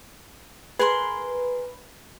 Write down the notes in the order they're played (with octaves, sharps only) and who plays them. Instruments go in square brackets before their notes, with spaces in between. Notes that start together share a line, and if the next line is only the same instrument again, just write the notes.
[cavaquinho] G#4 A#4 C6 [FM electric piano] B4